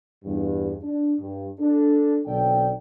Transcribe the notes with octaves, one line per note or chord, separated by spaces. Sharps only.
E2 G2
D4
G2
D4 A4
B1 D3 C4 A4 D5 G5